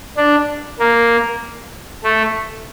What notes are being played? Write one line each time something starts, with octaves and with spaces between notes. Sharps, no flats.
D4
A#3
A3